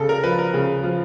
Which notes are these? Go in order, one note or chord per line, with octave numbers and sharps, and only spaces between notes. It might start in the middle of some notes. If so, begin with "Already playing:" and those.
Already playing: C#3 A4
A#4
F3 B4
A#4
C#3
F3